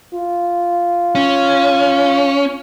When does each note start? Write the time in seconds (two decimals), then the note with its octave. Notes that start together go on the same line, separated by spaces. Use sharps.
0.15 F4
1.15 C#4